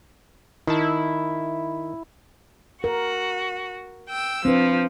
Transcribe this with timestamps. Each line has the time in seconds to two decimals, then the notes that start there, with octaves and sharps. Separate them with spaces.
0.67 D#3 E4 A5
2.84 F#4 A#4
4.08 G5 E6
4.45 F3 C4 D4 B4